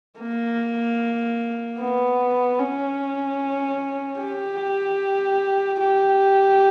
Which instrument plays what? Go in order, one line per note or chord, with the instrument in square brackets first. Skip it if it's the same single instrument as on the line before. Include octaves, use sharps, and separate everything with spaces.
[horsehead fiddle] A#3
B3
C#4
G4
G4